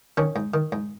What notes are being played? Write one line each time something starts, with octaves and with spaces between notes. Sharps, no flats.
D#3 C#4
G#2
D#3
G#2